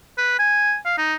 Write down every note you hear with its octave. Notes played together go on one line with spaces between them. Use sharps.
B4
G#5
F5
D#4